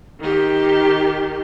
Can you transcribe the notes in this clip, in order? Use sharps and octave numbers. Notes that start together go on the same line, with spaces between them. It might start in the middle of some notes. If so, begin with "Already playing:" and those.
D#3 G4